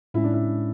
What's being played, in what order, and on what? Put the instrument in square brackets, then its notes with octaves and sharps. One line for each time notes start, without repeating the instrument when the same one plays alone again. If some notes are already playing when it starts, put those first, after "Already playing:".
[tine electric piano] A2 G#3 C#4 [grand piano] E4
[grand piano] D4
E4